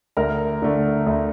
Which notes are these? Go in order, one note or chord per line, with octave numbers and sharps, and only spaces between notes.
D2 A#4 A#5
D3 A3
D2